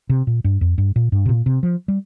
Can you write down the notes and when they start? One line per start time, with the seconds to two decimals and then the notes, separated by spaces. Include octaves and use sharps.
0.10 C3
0.27 A#2
0.44 G2
0.61 F2
0.78 G2
0.96 A#2
1.12 G2
1.26 C3
1.29 A#2
1.46 C3
1.63 F3
1.88 G3